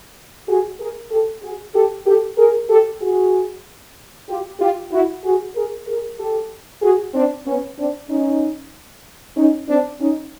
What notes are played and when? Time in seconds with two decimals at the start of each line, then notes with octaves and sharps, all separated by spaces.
0.49 F#4 G#4
0.80 G#4 A#4
1.11 G4 A4
1.43 F#4 G#4
1.75 G4 A4
2.06 G4 A4
2.38 G#4 A#4
2.70 G4 A4
3.02 F#4 G#4
4.29 F4 G4
4.60 F4 G4
4.92 E4 F#4
5.24 F#4 G#4
5.56 G#4 A#4
5.88 G#4 A#4
6.20 G4 A4
6.83 F#4 G#4
7.14 C4 D4
7.47 B3 C#4
7.78 C4 D4
8.09 C#4 D#4
9.37 C#4 D#4
9.69 C4 D4
10.01 C#4 D#4